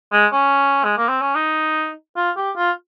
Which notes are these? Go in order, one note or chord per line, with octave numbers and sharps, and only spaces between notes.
G#3
C#4
G#3
A#3
C4
C#4
D#4
F4
G4
F4